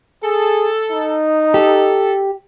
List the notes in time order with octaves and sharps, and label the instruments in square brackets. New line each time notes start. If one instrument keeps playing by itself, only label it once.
[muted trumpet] G#4 [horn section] A4
[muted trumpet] D#4
[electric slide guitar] G4 [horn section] A4